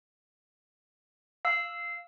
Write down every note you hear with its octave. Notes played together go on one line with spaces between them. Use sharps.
F5 E6